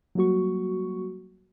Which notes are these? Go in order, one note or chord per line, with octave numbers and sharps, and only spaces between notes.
F#3 G3 A#3 F#4 C#6